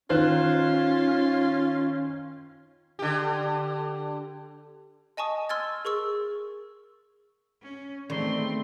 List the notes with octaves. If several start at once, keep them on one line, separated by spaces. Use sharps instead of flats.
D#3 C#4 F4 C5 F#6
D3 G4
D#5 G#5 A5 C#6 D#6
C6 E6 F6 G#6 A6
G#4 A#4 C#6 E6
C#4
E2 D#3 A3 C4 D5 D#5 C6 C#6